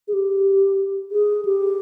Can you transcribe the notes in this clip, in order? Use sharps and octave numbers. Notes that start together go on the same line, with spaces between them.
G#4
G4
G#4
G4